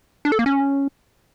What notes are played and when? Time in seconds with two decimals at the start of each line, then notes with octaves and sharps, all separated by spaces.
0.25 D4
0.32 A4
0.39 A#3
0.46 C#4